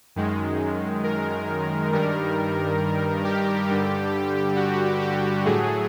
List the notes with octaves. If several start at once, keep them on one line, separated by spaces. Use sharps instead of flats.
F#2 D#3 G#3
A#4
G2 D#3 G3 A#4
G4
G2 D3 G3
F#4
G4
A2 F#3 A3 G#4